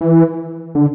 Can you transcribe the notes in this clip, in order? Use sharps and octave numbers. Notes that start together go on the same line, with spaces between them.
E3
D3